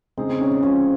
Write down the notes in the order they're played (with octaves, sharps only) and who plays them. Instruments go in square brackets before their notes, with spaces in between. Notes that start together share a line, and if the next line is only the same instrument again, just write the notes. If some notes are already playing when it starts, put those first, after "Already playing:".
[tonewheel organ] C#3 G#3 D#4 G#4 [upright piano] C4
[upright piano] C4
C#4
C#4
[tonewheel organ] F3 G#3 C4 F4 [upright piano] C#4